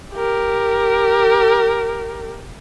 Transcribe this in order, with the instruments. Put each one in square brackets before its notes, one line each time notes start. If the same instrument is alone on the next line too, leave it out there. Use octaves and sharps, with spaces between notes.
[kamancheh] G4 A#4